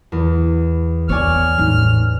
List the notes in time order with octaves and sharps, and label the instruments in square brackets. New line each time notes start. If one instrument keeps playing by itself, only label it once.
[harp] E2
[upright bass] B3 [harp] C#5 D5 G#5 [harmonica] F6
[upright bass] A1 D#4